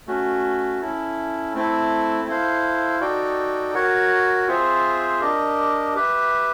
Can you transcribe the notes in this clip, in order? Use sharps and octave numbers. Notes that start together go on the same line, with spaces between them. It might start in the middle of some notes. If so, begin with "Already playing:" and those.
A3 C#4 F#4
C#4 E4 A4
A3 C4 E4 A4
E4 A4 C5 F5
D#4 F#4 A4 D5 G5
F#4 A#4 C#5 F#5
C4 F4 G#4 C5 E5
D4 G4 A#4 D#5
G4 B4 E5